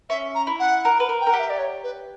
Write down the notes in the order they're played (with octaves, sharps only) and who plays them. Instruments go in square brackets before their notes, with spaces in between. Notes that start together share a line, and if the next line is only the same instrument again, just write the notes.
[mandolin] C#4 [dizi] E5
[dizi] A#5
[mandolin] E4
[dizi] F#5
[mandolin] A#4
B4
A#4
[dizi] G5
[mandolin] A#4
[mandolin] G4 [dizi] F#5
[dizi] E5
D5
C#5
B4